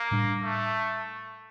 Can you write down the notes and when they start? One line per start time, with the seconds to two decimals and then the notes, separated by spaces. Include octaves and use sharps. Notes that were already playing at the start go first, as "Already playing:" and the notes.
Already playing: A#3
0.11 A2 G3 D4
0.43 A3